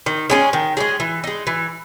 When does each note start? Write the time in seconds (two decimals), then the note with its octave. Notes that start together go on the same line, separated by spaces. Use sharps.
0.06 D#3
0.30 G#3 C#4 G#4
0.53 D#3
0.77 G#3 C#4 G#4
1.00 E3
1.24 G#3 D#4
1.47 E3